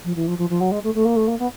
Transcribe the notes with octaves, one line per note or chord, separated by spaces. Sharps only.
F3
E3
F3
F3
F3
F#3
G#3
A3
A3
A#3
A3
A#3
B3